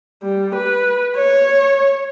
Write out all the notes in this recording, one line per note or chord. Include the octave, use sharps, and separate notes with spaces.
G3
B4
C#5